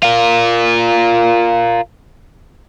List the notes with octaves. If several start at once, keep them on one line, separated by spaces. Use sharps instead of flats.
F4 A#4